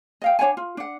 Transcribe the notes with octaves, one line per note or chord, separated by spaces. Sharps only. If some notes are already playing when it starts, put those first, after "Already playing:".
D#5 F5 G5
D4 C#5 F#5 G#5
F4
D4 F#5